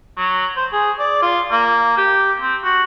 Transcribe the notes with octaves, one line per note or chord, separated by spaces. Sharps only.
F#3
C5
G#4
D5
F4
A#3
G4
C4
F#4